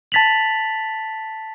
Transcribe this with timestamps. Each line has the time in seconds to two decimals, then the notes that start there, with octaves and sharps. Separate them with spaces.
0.12 A5 A6 B6 F7 F#7